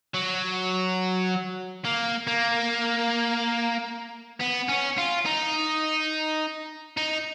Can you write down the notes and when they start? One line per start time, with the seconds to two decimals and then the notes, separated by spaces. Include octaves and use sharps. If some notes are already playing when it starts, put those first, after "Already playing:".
0.15 F#3
1.85 A#3
2.27 A#3
4.41 B3
4.69 C#4
4.98 F4
5.26 D#4
6.97 D#4